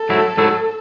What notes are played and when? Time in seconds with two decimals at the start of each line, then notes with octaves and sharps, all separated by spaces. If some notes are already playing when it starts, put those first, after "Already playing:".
Already playing: A4
0.09 G#2 F#3 A3 E4
0.37 G#2 F#3 A3 E4